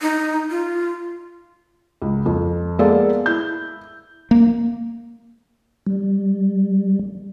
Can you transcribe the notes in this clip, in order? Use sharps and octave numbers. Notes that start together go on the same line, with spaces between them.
D#4
F4
C#2
F2
G#3 A#3 B3 A4 D5 F5
E4 G6
A#3
G3